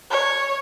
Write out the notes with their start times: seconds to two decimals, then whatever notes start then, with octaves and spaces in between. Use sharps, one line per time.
0.11 C#5